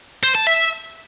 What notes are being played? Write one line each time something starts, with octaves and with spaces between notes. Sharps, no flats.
C5
A5
E5